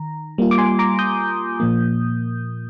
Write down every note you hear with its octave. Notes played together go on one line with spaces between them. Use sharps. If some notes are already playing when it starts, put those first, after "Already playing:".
Already playing: D#3 A#5
G3 A#3 F4
D6
G#5 C6
A#5 D6
D#6 G6
A#2 F3 A#3